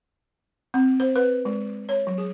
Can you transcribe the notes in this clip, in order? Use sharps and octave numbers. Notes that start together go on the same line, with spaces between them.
C4
C5
B4
G#3
C#5
F#3
G#4